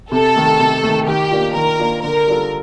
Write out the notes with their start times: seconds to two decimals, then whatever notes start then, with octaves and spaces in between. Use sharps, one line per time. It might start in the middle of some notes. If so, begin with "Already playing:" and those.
0.12 C3 A4
0.36 D#3 A3
0.60 C3
0.83 A3
0.88 D#3
1.07 D#3 G4
1.31 A#3 D4 F4
1.55 D#3 A#4
1.80 A#3 D4 F4
2.03 D3 A#4
2.27 G3 D4 F4 A4